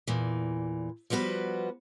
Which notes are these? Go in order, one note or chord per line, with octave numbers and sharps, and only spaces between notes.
E2 A#2 E3
F3 G3 B3 F#4 B4